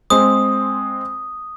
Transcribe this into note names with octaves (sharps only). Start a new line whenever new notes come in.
G#3 C4 D#6